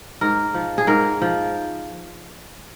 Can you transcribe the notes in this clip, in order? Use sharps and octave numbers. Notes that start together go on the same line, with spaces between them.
G#2 A#4
F3
G#4
G#2 A#4
F3